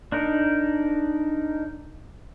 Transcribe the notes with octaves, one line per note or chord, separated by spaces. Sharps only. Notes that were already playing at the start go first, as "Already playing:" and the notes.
D4 D#4 A#4